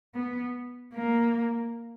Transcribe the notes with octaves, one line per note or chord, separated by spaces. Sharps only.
B3
A#3